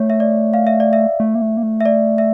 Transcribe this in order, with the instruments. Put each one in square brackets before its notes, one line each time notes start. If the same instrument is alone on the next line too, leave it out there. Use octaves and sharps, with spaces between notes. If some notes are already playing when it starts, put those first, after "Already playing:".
Already playing: [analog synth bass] A3 [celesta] C#5
[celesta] E5
D5
F5
E5
D5
E5
[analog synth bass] A3
A#3
A3
A#3
A3
[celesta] E5
D5
E5